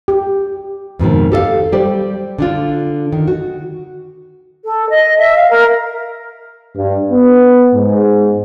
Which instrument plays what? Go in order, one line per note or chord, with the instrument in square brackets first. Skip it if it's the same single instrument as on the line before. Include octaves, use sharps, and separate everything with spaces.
[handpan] G4
[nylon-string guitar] F2 G#2 B2 D#3
G4 A4 D#5 F5
G3 G4 C5 D5
D3 D4 F4
D#3
F#4
[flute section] A4
D#5
E5
F5
A#4
[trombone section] G2
B3
G#2